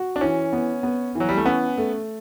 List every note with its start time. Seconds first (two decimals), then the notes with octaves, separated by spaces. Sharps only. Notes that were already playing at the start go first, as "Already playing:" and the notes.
Already playing: F#4
0.16 D4
0.21 E3 C#4
0.53 B3
0.83 B3
1.15 E3
1.20 F#3
1.29 G3
1.37 A3
1.46 B3 C#4
1.77 A3